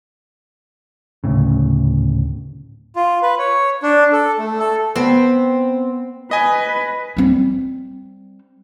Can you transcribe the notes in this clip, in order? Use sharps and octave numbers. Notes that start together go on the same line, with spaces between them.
G#1 D2 A2 C#3
F4
B4
C#5
D4
A4
A3
A4
B3 C4
B4 D#5 G#5
G3 C4